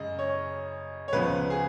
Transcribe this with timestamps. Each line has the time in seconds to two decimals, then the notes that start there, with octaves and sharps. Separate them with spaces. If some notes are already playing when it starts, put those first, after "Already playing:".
Already playing: F#2 C#3 G#3 D#5
0.19 C#5
1.08 C#5
1.13 C#2 C#3 F3 B3 B4
1.50 G#4